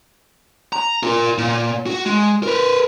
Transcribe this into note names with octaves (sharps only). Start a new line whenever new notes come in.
A#5
F4 A#4
A#2
F#4
G#3
A#4 B4